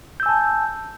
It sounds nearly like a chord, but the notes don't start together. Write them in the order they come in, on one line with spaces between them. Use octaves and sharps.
G6 E6 G#5 A5